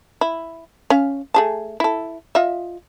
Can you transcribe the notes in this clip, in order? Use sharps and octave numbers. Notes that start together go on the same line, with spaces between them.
E4
C#4 F5
A3 G#4 A5
E4 A4
F4 D#5 E5